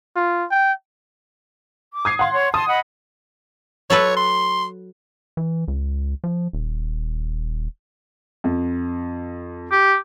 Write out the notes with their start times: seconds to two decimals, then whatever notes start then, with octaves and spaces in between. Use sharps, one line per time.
0.16 F4
0.51 G5
1.94 D6
2.05 D#6 G#6 C7
2.19 F5 F#5 C6
2.33 C#5
2.54 A5 C6 D#6
2.68 D#5 F#5 B5
3.90 F#3 A4 B4 C#5
4.17 C6
5.37 E3
5.68 C#2
6.24 F3
6.53 D#1
8.44 F2
9.71 G4